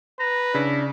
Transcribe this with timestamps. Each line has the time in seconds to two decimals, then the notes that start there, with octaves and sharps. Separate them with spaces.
0.19 B4 A#5
0.54 C#3 D4 E4